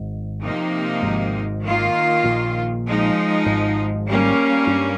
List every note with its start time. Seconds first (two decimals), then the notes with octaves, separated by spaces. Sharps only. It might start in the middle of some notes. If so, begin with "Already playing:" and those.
Already playing: G#1 G#2
0.42 C3 F3 A#3 D#4
1.03 G#1 G#2
1.64 D#3 A#3 F4
2.24 A#1 A#2
2.85 F3 G#3 D#4
3.46 G#1 G#2
4.06 G3 A#3 C#4
4.67 G2